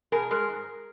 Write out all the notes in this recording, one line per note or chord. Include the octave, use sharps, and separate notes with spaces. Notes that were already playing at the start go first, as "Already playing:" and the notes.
B2 G#4 A#4
G#3 G#4 A#4
G#2